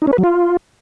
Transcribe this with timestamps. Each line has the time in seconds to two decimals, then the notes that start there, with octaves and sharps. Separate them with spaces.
0.02 D#4
0.07 C#4
0.13 B4
0.18 F#3
0.24 F4